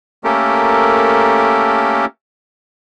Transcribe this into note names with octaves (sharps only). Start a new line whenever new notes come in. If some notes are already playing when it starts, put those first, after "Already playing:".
A3 A#3 C#4 G4 A4 A#4